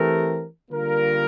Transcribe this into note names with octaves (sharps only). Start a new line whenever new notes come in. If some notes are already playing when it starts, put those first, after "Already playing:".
Already playing: E3 A3 C4 G4 A#4
D3 G3 A#3 F4 A#4